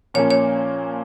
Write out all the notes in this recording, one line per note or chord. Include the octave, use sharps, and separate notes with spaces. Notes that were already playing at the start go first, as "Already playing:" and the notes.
A#2 F3 A#3 C#4 C#5
C#5